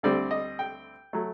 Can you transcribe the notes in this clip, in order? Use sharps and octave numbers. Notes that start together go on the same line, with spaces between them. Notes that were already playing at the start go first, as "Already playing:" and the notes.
D2 D3 G3 C4 D5
D#5
G5
F#3 A3